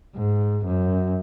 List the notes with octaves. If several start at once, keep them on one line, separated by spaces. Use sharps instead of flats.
G#2
F#2